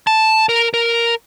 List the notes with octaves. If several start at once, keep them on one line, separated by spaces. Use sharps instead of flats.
A5
A#4
A#4